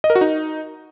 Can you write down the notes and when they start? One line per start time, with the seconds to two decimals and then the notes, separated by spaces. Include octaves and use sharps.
0.04 D#5
0.10 A#4
0.15 F#4
0.21 D#4